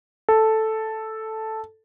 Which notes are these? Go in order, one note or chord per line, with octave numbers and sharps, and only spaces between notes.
A4